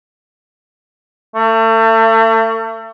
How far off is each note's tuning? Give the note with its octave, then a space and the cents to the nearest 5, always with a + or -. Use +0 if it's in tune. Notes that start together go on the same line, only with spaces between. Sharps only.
A3 +35